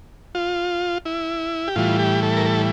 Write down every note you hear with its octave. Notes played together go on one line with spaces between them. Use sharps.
F4
E4
G4
A2 E3 G3 F4
G4
A4
A#4
A4